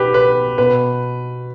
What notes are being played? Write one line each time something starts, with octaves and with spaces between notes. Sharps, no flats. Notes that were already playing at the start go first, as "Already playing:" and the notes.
Already playing: B2 G4 B4
B4
B2 B4